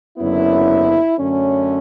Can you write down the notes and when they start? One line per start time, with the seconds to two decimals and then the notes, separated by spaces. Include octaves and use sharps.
0.18 F#1 F#2 D3 F#3 B3 E4
1.18 F#2 D3 A3 C#4